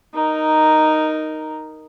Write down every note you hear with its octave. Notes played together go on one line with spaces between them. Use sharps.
D#4 A#4